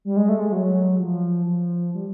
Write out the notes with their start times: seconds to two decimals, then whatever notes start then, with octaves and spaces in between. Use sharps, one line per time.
0.05 G3
0.16 G#3
0.29 A3
0.40 G#3
0.52 F#3
1.00 F3
1.48 F3
1.95 G3